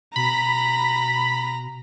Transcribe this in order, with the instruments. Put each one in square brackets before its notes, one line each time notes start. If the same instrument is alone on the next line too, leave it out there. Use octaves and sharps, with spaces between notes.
[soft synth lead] B2 [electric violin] A#5 [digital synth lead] B5